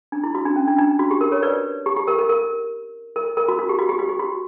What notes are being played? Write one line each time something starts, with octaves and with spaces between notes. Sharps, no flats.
D4
E4
F#4
D4
C#4
D4
D4
F#4
G4
A#4
A#4 C#5
B4 D5
G4
G4
A#4
A#4
A#4
A#4
A#4
F#4
F#4
G4
F#4
G4
F#4
G4
F#4